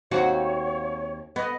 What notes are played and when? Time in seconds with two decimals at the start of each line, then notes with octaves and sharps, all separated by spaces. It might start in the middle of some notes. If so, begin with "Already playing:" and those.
0.11 D#2 C4 F#4 C#5
1.36 B3 D#5